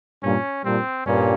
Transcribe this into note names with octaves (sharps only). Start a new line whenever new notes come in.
G2 A#2 C#4
G2 A#2 C4
G2 A#2 C#4